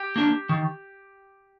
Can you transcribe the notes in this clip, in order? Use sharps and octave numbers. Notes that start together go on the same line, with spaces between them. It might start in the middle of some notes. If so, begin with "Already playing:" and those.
Already playing: G4
A#3 D4
D#3